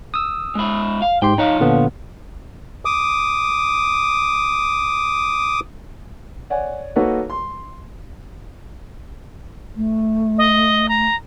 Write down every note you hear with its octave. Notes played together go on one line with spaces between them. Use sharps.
D#6 E6
G#3 E4
F5
G#2 G4 G5 C6
F3 D#4 C#5 F5
A#2 D3 B3
D6 D#6
C#5 D5 F#5 G#5
A#3 D#4 F#4 A4 B4 C#5
C6
A3
D#5
A#5